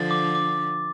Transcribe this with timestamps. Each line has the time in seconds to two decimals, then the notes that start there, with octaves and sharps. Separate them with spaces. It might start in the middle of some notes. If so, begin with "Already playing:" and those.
Already playing: D3 F3 A6
0.11 D6
0.35 D6